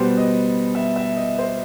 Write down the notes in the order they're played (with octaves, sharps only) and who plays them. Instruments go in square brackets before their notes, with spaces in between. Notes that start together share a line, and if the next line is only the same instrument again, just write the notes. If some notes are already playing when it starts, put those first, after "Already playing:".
Already playing: [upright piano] B2 G3 B3 C5
D#5
E5
E5
D#5
C5